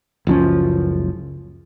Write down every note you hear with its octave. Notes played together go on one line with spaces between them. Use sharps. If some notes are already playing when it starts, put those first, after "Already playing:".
F#1 C#2 F3 C#4